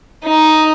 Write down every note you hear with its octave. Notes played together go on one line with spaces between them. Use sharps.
D#4